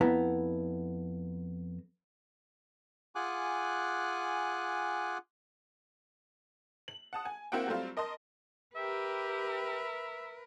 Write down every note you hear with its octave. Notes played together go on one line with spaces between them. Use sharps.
F2 B3 E4 A#5
F4 G#4 F#5 G#5 D6 F#6
F#7
F#5 A5 D#6
G#5
A#3 C4 E4 F#4 F#5 G5
F#3 G3 A3 C4 F4
A#4 D#5 A5 C6 D#6
G4 A#4 B4 E5